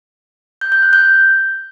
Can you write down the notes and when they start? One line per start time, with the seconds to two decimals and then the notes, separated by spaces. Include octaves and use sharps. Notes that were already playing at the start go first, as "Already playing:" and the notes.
0.61 G6
0.72 G6
0.82 F#6
0.93 G6